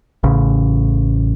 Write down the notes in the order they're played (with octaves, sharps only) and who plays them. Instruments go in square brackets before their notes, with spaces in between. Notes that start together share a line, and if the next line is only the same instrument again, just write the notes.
[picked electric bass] A1 C#3